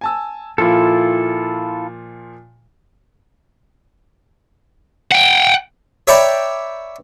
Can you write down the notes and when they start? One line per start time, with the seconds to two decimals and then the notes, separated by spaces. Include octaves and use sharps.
0.01 G#5 A5 E6
0.58 A#2 F3 E4 F4 A4
5.12 F#5 G5
6.07 C#5 D5 E5 G5 A#5 B5